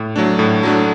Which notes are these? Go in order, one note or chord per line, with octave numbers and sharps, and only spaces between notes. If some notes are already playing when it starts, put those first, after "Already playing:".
Already playing: A2
F#3 A3 D4
A2
F#3 A3 D4